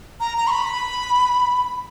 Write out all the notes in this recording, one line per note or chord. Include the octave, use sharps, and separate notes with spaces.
A#5
A#5
C#6
B5